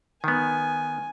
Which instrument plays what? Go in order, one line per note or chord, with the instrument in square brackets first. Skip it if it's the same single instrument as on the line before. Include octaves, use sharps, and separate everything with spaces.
[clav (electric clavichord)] D#3 B3 [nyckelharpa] G#5